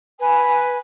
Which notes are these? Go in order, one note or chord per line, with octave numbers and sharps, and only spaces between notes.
B4 G#5